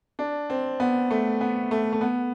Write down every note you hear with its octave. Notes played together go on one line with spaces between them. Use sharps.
D4
C4
B3
A3
B3
A3
A3
B3